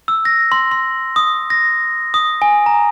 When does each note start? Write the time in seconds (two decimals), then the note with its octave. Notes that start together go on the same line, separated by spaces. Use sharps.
0.08 E6
0.25 A#6
0.52 C6
0.72 C6
1.16 D#6
1.50 A#6
2.14 D#6
2.42 G#5
2.66 A#5